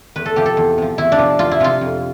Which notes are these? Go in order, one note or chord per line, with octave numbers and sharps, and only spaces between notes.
E2 B4
A4
C3 F3 G4
A4
E2
C3 F3
E2 E4
D4
C3 F3
E2 F4
E4
C3 F3 F4
F2